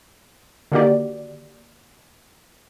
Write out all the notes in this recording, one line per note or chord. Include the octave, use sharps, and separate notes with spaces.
D3 D#3 A#3 F#4 G4 D5